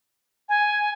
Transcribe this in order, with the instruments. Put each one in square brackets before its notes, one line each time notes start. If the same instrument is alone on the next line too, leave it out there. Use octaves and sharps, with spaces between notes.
[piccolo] G#5